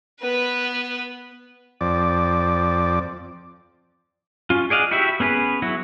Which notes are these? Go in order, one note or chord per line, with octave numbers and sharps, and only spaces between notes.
B3 B4
F2 D5
C#4 F4
G#4 D5 D#5 F5 F#5
E4 F#4 G4 E5
B3 C#4 G#4 B4
F#3 E4 F#4